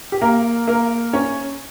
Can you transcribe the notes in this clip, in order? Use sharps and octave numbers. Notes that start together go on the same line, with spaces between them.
G4
A#3 A#4
A#3 A#4
C#4 C#5